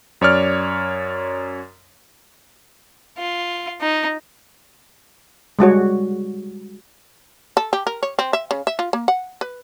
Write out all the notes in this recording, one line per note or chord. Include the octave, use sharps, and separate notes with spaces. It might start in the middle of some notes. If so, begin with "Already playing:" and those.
F#2 C#5 D5 F6
F4
D#4
G3 G#3 F#4 C#5
A4
G4
A#4
C#5
C4
E5
C#3
E5
F4
A#3
F#5
B4